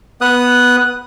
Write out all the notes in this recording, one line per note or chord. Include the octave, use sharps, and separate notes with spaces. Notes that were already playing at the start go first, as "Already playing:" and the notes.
B3 D#6 F#6